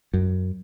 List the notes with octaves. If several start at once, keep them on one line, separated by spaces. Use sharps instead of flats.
F#2